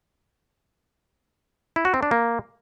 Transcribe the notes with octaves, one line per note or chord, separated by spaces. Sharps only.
E4
F#4
C4
D4
A#3